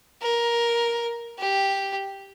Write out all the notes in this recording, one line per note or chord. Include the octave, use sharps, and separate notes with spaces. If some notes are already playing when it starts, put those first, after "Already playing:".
A#4
G4